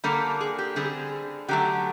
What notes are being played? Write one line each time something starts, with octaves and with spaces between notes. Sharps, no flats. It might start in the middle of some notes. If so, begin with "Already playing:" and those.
D3 G3 A#3 A4
G#4
G4
D3 G3 C4 G#4
D3 F#3 A3 G4